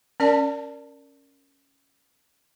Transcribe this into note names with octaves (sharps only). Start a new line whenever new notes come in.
C#4 A#4 D5 A5